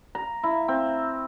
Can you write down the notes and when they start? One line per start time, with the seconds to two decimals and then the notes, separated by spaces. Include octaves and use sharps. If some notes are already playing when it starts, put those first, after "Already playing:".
0.15 A#5
0.43 E4
0.68 C4